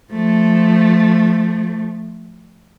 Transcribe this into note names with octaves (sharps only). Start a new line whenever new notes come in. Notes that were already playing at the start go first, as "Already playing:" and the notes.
F3 A3